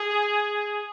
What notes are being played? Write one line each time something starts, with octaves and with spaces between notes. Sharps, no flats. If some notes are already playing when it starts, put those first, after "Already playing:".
Already playing: G#4